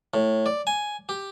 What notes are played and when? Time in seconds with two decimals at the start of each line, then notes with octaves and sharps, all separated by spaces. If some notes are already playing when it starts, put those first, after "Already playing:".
0.14 A2
0.46 D5
0.67 G#5
1.09 G4